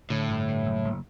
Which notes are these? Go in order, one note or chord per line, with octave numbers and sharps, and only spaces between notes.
A2 D3
G1
G2
F#1
F#1